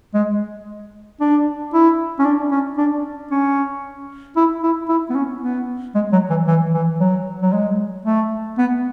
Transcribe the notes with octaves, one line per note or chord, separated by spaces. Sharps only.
G#3
D4
E4
C#4
D4
C#4
D4
C#4
E4
E4
E4
B3
C#4
B3
G#3
F#3
E3
E3
E3
F#3
F#3
G#3
A3
B3